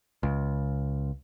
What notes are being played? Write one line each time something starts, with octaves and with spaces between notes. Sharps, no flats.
C#2